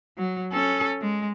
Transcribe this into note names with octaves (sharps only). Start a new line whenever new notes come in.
F#3
C#4 A4
G#3